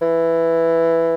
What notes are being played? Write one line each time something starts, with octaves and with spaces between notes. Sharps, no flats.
E3